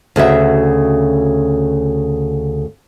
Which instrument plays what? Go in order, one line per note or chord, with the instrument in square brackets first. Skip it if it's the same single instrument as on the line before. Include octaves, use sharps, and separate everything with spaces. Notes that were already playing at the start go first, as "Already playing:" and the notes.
[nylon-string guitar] D2 C#3 F#4 E5